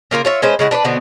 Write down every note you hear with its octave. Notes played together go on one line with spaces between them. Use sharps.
C#3 A#3 F4 A#4
F4 C#5 E5
G#3 C#4 B4 C5
C#3 G#3 E4 F#5
D4 B4 C5 D5
B2 D3 B3 C4